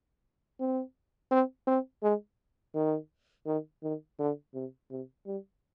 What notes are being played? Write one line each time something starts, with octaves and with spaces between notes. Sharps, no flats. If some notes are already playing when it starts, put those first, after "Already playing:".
C4
C4
C4
G#3
D#3
D#3
D#3
D3
C3
C3
G3